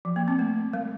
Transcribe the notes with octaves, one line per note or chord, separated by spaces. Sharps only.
F3
A#3
C4
A3
G3